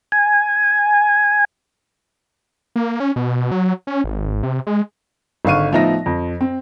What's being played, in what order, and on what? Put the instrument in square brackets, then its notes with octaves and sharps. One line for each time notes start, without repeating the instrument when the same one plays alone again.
[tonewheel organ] G#5
[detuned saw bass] A#3
C#4
B2
F#3
C#4
G#1
C3
G#3
[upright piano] G#1 D3 F5 C#6 D#7
A2 F3 B3 D#4 E5 A#6
F2
C4